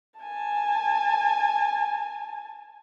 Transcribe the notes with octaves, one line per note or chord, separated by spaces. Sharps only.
G#5 A5